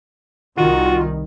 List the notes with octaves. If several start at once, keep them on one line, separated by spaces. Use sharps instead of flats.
C2 D#3 F4 F#4